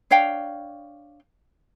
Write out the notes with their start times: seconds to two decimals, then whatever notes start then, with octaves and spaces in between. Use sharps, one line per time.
0.11 D4 C#5 F5 G5